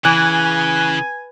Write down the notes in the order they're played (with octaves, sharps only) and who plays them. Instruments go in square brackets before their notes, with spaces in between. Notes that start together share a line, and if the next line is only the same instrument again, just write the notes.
[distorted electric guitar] C#3 [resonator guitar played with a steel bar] E3 [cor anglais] G#5 [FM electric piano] F#6